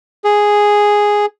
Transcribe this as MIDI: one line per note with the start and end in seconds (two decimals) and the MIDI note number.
0.25 1.26 68